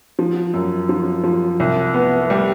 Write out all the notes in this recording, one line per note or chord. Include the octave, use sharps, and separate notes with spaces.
F3
F#2
F3
F3
C2
B3
G3